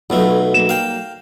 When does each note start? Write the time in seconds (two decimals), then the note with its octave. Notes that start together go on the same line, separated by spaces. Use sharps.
0.10 B1 B2 F#3 A3 F4
0.54 F#3 G3 A#3 E7
0.69 F5 G5